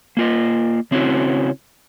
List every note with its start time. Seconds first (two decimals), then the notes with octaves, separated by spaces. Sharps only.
0.17 A#3 F4 D#5
0.91 C#3 C4 C#4 E4 F#4